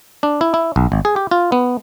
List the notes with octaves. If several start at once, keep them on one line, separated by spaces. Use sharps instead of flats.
D4
E4
E4
B1
G#1
G#4
G4
F4
B3